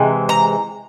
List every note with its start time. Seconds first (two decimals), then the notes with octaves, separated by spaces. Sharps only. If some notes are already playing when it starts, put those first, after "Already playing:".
Already playing: C3 E3 G#3
0.29 A#5